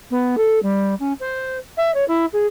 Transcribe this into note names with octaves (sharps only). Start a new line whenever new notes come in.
B3
A4
G3
C#4
C5
E5
C#5
E4
G#4